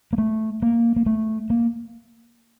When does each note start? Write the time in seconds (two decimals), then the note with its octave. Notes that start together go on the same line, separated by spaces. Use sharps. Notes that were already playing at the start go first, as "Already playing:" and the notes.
0.13 A#3
0.18 A3
0.62 A#3
0.96 A#3
1.06 A3
1.50 A#3